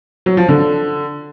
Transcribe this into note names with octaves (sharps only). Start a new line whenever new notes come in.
F#3
F3
D3